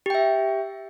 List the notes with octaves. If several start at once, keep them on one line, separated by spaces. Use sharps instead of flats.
G4 E5 G5